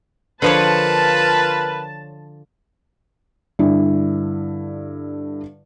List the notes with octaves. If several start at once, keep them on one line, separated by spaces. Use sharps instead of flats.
D3 F3 F4 A#4 B4 C#5 A5
G2 D3 E4